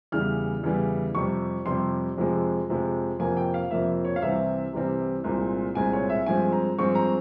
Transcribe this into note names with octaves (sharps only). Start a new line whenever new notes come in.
E2 C#3 E3 G3 F6
E2 C#3 E3 G3
F2 C3 G3 C#6
F2 C3 G3 C6
F2 C3 F3 G#3
F2 C3 F3 G#3
F2 C3 F3 A#3 G#5
G5
F5
F2 C3 F3 A#3 E5
C#5
F5
C2 C3 E3 G3 C4 E5
C2 C3 E3 G3 C4
C2 A#2 G#3 C4
C2 A#2 G#3 C4 G#5
C#5
E5
G2 F3 G#3 C4 G#5
A#5
G2 F3 G#3 C4 C#6
A#5